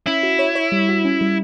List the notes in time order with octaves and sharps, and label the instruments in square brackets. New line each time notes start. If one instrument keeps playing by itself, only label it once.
[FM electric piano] C#4 [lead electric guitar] E4
[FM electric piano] F#4
C#5
C#5
G3
F#4
C#4
G3